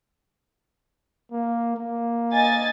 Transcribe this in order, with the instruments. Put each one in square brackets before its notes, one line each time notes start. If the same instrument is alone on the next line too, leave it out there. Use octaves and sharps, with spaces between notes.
[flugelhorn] A#3
A#3
[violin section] D#5 G#5 A6